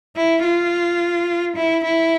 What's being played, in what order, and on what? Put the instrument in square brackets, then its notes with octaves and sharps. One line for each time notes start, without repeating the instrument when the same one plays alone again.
[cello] E4
F4
E4
E4